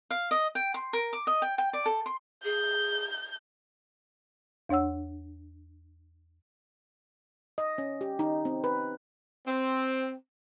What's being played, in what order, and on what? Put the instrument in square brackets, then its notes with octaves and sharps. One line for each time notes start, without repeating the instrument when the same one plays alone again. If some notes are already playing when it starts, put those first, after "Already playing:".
[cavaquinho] F5
D#5
G5
C6
A#4
D6
D#5
G5
G5
D5
A4
C6
[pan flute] G#4 [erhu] G6
[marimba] E2 D4 C#5 F#5 E6
[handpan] D#5
C#4
G4
D#4
C4
B4
[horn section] C4